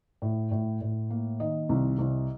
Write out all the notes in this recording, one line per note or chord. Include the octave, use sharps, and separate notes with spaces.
A2
A2
A2
A#3
D#3 D#5
C2
C2